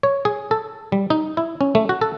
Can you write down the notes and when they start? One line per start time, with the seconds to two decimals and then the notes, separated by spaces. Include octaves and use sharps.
0.03 C#5
0.25 G#4
0.51 A4
0.92 G3
1.10 D#4
1.37 E4
1.61 C#4
1.75 A3
1.89 F#4
2.01 A4